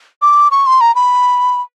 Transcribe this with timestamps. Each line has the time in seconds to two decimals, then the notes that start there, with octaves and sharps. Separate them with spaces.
0.22 D6
0.51 C#6
0.66 C6
0.81 A#5
0.95 B5